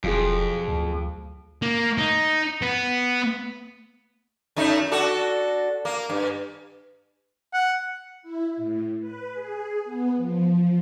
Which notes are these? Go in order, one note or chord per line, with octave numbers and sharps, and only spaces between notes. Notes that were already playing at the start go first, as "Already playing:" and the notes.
E1 F2 F#3 F4 G#4
D2
A#3
D#4
B3
F#2 A3 D#4
D4 F#4 A4
A#3
G2
F#5
E4
A2
B4
G#4
B3
F3